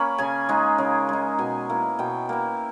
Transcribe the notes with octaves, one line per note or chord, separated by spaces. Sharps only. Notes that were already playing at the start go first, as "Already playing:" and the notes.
Already playing: A#3 C#4 B5 C#6
C#3 G#5
G#3 D#4
C#3
G#3 D#4
B2 G#5
A#3 E4
B2 G5
A#3 E4